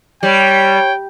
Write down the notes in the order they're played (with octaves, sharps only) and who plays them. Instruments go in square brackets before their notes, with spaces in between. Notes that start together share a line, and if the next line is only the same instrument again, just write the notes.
[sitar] G3 [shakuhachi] C#5 [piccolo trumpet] G5